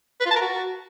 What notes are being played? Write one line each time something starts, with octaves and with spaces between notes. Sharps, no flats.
B4
F4
A5
A#4
F#4